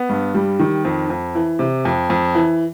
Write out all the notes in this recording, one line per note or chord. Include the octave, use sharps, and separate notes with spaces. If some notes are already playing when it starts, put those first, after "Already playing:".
Already playing: B3
G2
G3
D#3
F2
F2
E3
C3
F2
F2
E3